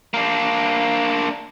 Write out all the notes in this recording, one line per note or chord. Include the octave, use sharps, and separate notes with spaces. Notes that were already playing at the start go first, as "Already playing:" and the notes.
A#3 D4